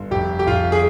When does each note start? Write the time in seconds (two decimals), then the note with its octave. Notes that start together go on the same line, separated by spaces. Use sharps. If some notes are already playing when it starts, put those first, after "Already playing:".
Already playing: G1
0.11 F1 G4
0.39 G4
0.47 F1 F4
0.72 G#4